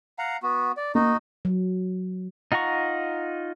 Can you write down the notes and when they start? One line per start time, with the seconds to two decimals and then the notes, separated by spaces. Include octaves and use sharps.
0.19 F5 F#5 A#5
0.43 B3 F#4
0.77 D5
0.95 A#3 D#4 F#4 D#5
1.45 F#3
2.52 D#4 F4 F#5 A#5 C#6